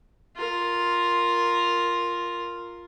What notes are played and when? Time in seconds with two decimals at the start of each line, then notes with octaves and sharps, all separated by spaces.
0.36 F4 A#4